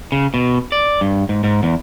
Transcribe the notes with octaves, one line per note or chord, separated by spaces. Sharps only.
C#3
B2
D5
G2
G#2
G#2
E2